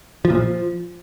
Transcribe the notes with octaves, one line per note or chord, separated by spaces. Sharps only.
F3
A#2
F3